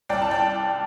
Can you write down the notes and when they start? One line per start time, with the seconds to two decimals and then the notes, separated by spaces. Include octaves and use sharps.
0.09 C2 D5 G5
0.22 A5
0.31 D5 G5